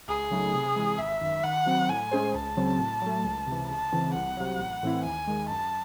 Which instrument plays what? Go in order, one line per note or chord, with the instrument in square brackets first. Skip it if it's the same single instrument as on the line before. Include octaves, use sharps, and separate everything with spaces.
[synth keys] C#2 [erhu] G#4
[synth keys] C#3 F#3 A3 D#4
C3
E3 G#3
[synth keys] G#1 [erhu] E5
[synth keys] F#2 D#3
[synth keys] D#3 [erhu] F#5
[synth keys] F#3 C4
[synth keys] A2 [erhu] G#5
[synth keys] G#3 C#4 G#4 C5
[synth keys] C#2 [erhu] A5
[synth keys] C#3 F#3 C4
A2
F#3 A3
C#2
C3 E3
[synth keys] C#2 [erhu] A5
[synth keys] C#3 E3 C4
[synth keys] C2 [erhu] F#5
[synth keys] C3 F#3
A1
A2 E3 C4 E4
[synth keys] D#2 [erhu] G#5
[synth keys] D#3 G#3
[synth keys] F#2 [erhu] A5